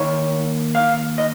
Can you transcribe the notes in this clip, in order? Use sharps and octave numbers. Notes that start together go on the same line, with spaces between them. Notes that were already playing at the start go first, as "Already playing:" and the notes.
Already playing: D#2 D#3 A#3 C#5
F5
D#5